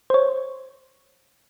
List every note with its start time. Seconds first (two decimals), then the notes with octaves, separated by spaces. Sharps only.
0.10 C5 C#5